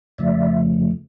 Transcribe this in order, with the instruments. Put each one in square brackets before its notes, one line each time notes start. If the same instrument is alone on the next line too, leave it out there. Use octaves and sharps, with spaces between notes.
[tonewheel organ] F2 C#3 F3 A3 D5 E5